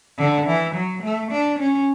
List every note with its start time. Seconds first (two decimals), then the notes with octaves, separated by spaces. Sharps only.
0.19 D3
0.47 E3
0.75 F#3
1.03 A3
1.31 D4
1.59 C#4